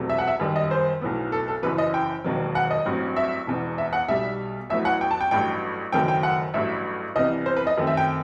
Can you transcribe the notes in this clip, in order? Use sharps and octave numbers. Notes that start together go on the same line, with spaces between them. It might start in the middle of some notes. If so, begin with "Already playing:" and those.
Already playing: E1 E2 C3 F#3 A3
E5
F#5
E5
F#2 D#3 G3
D#5
C5
B1 A2 F#3 B3
A4
A4
F#1 F#2 E3 B4
D#5
G5
E1 D#2 D#3 F#3
F#5
D#5
A1 G2 F#3 C4
E5
E1 E2 B2
E5
F#5
B1 B2 G3 E5
A1 A2 F#3 B3 E5
F#5
G5
A5
G5
A1 G2 F#3 G5
F#1 F#2 D#3 F#3 A3 G5
G5
F#5
A1 G2 F#3 E5
C2 C3 E3 B3 D#5
C5
B4
D#5
F#2 D#3 A3 C4
E5
G5